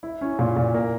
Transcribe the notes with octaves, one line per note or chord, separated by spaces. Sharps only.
E4
C#4
A#2
A#2
A#3